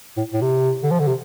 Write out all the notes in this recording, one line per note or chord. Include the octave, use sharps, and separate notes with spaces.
A2
A2
C3
D3
F3
D3
C3